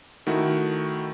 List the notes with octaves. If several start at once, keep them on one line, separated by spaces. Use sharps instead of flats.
D#3 A3 E4 F#4